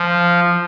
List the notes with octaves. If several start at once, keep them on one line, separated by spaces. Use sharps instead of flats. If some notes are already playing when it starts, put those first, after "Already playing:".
Already playing: F3